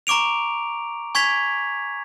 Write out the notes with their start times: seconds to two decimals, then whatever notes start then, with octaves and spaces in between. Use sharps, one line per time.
0.07 A#5 C#6 D6 D7 F7
1.15 G#5 C#6 G#6 B6 F7